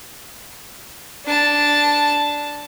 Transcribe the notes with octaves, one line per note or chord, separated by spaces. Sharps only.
D4 A5